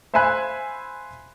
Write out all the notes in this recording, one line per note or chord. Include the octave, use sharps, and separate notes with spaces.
C5 E5 F5 G#5 B5 F#6